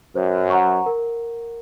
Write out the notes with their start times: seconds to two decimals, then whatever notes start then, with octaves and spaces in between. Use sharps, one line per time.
0.16 F#2 C5
0.50 F#5 A#5 C#6
0.86 A#4